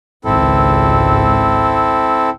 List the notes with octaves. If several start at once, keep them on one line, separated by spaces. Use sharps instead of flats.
G#1 C#2 C4 E4 A4